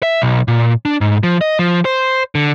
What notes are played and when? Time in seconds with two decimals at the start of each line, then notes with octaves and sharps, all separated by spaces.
0.03 E5
0.22 B1
0.48 A#2
0.85 D4
1.01 G#2
1.23 F3
1.41 D#5
1.59 F3
1.85 C5
2.35 D3